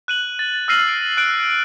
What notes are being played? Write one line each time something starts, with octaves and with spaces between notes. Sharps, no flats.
F#6 D#7 F#7
A6
E6 F6 A#6 C7 D#7 F#7
D7
F#6 D7